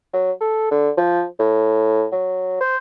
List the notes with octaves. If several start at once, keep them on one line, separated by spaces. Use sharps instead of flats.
F#3
A4
D3
F3
A2
F#3
C5